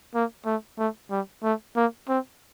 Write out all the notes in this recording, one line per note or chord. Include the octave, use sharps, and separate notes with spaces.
A#3
A3
A3
G3
A3
A#3
C4